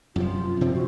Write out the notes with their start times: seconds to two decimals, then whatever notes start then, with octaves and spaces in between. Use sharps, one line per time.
0.16 F#2 C3 F3 F4
0.61 C3 F3 C4
0.74 F#4